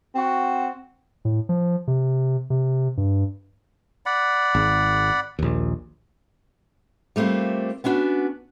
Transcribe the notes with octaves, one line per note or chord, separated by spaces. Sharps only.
C4 F#4
A2
F3
C3
C3
G2
D5 F#5 B5
G#1
A#1 D#2
G3 A3 A#3 C4 F4
B3 C#4 D4 F#4